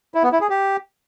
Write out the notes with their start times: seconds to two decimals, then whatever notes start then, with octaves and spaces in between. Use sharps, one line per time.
0.14 E4
0.23 B3
0.32 E4
0.41 G#4
0.50 G4